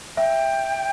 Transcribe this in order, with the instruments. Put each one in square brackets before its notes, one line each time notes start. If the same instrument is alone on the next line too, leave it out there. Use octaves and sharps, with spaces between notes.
[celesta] E5 [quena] G5